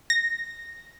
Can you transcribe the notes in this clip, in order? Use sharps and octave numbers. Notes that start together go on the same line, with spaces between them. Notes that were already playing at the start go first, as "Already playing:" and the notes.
A#6